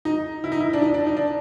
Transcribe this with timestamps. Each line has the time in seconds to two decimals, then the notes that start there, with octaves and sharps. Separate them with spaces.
0.05 D#4
0.44 E4
0.52 D#4
0.60 E4
0.73 D4
0.82 D#4
0.94 D4
1.07 D#4
1.17 D4